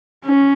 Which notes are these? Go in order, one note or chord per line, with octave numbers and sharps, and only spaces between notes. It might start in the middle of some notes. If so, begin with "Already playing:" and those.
C#4